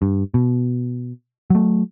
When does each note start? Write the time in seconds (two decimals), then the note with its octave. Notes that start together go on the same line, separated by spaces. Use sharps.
0.02 G2
0.34 B2
1.50 F#3 A3